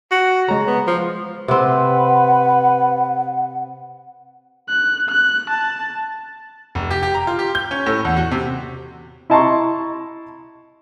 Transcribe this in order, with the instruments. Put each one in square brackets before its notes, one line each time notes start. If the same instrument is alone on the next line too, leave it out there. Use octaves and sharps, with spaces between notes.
[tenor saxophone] F#4
[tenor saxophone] C#3 [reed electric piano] G#3 A#5
[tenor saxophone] B3
F3
[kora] C3 C4 [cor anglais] B4 [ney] F#5
[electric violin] F#6
F#6
A5
[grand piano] F1
G4
G4
A#5
F4
G4
G6
C#4
A2
E2
F#4
C3
[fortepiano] E4 D#5 A5 A#5 C6 C#6